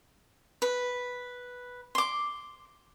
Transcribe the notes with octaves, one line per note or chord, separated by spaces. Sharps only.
B4
C6 D6